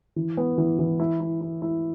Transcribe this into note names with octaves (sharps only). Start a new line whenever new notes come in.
E3
B3
E3
E3
E4
E4
E4
E4